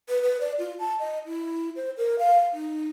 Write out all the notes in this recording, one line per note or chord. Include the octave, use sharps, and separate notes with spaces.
B4
B4
D5
F4
A5
D#5
E4
C5
A#4
F5
D#4